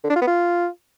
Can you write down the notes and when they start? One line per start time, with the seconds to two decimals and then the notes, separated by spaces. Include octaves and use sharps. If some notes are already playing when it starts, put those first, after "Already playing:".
0.04 D3
0.10 D4
0.16 F4
0.21 B3
0.27 F4